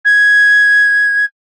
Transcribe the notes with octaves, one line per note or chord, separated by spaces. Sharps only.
G#6